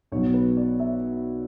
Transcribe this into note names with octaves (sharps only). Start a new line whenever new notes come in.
B1 B2 F#3 B3 C#5
B4
D5
E5